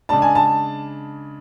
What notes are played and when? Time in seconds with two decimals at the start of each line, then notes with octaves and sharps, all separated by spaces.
0.09 C#3 G#3 D4 A5
0.22 G#5
0.35 A5